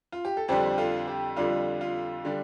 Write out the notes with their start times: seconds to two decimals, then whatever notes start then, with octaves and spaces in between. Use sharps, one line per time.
0.12 F4
0.25 G4
0.37 A4
0.48 F2 D3 G3 D4 G4 C5
0.78 F4 A4
1.07 G4
1.37 F2 D3 G3 D4 F4
1.81 F4
2.25 D3 G3 D4